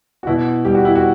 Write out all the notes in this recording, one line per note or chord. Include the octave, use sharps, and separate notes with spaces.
F#4
B2 E4
G3 G4
F#4
E4
F#4